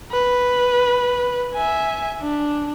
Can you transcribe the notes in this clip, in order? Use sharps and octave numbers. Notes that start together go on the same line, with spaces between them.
B4
E5 G#5
D4